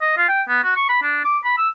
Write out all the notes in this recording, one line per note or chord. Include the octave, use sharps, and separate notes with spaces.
D#5
F4
G5
B3
F#4
C#6
B5
D4
D6
B5
E6